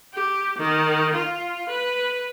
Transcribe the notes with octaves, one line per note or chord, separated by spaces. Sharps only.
G4
D#3
F4
B4